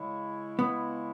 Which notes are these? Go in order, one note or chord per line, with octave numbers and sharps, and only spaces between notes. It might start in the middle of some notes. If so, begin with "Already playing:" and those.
Already playing: C#3 G#3 E4 C#5
B3